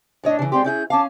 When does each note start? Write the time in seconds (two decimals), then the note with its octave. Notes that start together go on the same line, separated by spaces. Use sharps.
0.24 A2 D4 C#5 D#5
0.39 C#3 E3
0.52 G#3 C4 G4 D5 G5 C6
0.64 C#4 E4 G#4 G6
0.90 C#4 F5 A5 D6